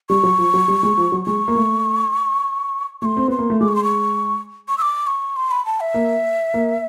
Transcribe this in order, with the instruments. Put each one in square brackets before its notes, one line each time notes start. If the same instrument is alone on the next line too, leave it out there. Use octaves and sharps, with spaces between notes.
[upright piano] G3 [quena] C#6
[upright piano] F#3
F3
F#3
G3
G#3
F3
F#3
[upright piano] G#3 [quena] C#6
[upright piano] A#3
A3
[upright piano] A3 [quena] C6 C#6
[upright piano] C4
[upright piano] B3 [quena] C6
[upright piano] A#3
A3
[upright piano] G#3 [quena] D6
[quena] C#6
C6
C#6
C#6
E6
D6
C#6
C6
B5
A5
E5
[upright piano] A#3
A#3